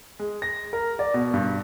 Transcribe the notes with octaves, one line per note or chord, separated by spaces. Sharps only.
G#3
A#6
A#4
D5
B2
G2